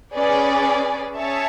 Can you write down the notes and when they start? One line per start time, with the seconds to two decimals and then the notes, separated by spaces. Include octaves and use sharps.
0.13 C#4 G#4 B4 D5
1.17 C#4 G#4 C#5 E5 A5